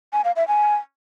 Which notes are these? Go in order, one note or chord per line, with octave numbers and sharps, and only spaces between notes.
G#5
F5
E5
G#5